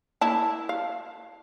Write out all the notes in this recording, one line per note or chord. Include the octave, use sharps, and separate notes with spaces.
A#3 E4 A5
F5